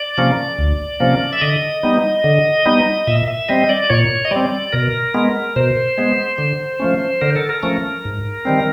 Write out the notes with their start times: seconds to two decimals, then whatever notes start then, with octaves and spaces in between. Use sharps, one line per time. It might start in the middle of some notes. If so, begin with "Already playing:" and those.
Already playing: D5
0.18 C3 F3 A#3 C#4
0.59 D2
1.00 C3 F3 A#3 C#4
1.33 E5
1.41 D3 D#5
1.83 G3 B3 D#4
2.24 D3
2.66 G3 B3 D#4
3.07 A#2 E5
3.28 E5
3.48 G3 C4 D#5
3.69 D5
3.90 A#2 C#5
4.25 D#5
4.31 G3 C4 D5
4.72 B2 A#4
5.14 G#3 B3
5.56 B2 C5
5.98 G#3 B3
6.38 D3
6.80 F3 A3 C#4
7.21 D3 A#4
7.36 A4
7.49 A#4
7.63 F3 A3 C#4
8.05 G#2
8.45 D#3 G3 C4